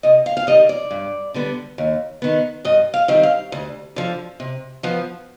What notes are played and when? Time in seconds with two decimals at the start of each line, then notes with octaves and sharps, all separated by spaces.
0.03 C3 D#5
0.26 F5
0.37 F5
0.47 D#3 G3 D#5
0.69 D5
0.91 G2
1.34 D3 G3 B3
1.78 D#2
2.22 D#3 B3
2.65 G2 D#5
2.94 F5
3.08 D#3 G3 C4
3.23 F5
3.52 D2
3.96 D3 F3
4.40 C3
4.83 F3 B3